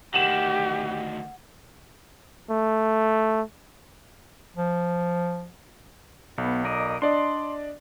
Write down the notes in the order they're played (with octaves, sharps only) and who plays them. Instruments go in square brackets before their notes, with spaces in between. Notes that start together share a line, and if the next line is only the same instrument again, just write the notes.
[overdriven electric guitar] D2 D#3 [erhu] G4 [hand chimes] F#5 [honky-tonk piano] E7 F#7
[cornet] A3
[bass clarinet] F3
[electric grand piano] B1 [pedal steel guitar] B3
[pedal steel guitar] A#4 D5 D#5
[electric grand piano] D4 D5 D#5 [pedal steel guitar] C6